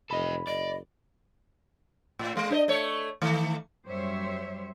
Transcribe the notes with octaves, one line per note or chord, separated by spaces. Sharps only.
F1 A4 D#5 B5
F#1 D5 D#5
A2
G#3
D4 C5 D#5
A3 C#5
D#3 A3
F#2 G3 C5 C#5 E5